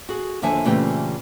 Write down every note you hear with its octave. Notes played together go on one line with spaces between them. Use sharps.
F#4 G#4
D#2 D3 F3 E5 G#5 A5
A#2 C#3 E3 A3 C4 G4